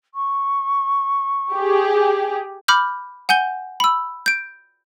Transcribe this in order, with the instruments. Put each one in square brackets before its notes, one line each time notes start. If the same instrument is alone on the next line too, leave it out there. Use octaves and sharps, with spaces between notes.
[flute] C#6
[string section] G4 G#4
[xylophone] B5 D6 F6 G6
F#5 G#5 G6 G7
B5 E6
G6 D7